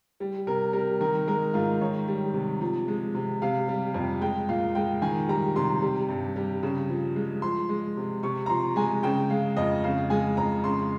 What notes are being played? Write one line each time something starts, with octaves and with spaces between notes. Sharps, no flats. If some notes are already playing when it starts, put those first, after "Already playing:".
G3
C3 A#4
G3 A#4
D#3 A#4
G#3 A#4
G#2 F4
D#3 C#5
G3
C3
F3
G#3
C3
C3 F5
G3
F2
G#3 G5
A#2 F5
G#3 G5
D#3 G#5
G3 A#5
C3 C6
G3
G2
G3
C#3
F3
G#3
F3 C6
G#3
C3
C3 C#6
A#5
F3 C6
G#3 G#5
C#3 G5
G#3 F5
F2 D#5
C#3 F5
G#3 G#5
F2 A#5
C#3 C6